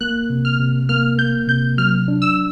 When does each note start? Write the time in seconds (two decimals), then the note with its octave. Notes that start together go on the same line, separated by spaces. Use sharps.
0.01 A#3 F#6
0.30 C3
0.45 F6
0.59 C3
0.89 A#3 F6
1.18 A#3 G6
1.48 C3 G6
1.78 F#3 F6
2.08 D4
2.22 E6